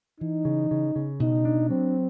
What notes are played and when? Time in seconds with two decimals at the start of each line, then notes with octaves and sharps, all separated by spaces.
0.20 E3 D#4
0.45 C#3
0.71 C#3
0.96 C#3
1.20 B2 D#4
1.45 D4
1.70 F#3 C4